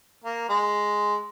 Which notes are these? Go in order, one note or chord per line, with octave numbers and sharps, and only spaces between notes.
A#3
G#3